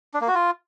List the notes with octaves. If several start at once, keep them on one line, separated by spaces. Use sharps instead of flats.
D4
A#3
F#4
F4